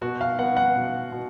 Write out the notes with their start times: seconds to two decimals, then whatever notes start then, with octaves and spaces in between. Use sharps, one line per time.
0.01 B2 F#4
0.21 F5
0.39 B3 F#5
0.57 F#5
0.76 B2
1.12 B2